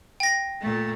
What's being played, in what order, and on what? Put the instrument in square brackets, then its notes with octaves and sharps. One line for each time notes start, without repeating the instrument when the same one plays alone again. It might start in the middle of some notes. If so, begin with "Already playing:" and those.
[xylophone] G5 A#6
[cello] A#2 A3